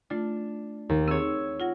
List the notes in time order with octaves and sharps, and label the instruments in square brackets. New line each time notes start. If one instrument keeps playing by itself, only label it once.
[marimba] A3 F4 [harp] D4
[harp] D#2
[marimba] C4 G#4 [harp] C#5 E6
[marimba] F4 F#5 A#6